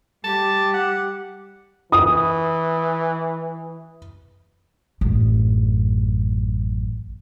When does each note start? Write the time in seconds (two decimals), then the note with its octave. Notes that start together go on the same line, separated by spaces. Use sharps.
0.24 G3 G4 A5
0.74 F#5
1.92 E3 D#6
5.01 A1 F#2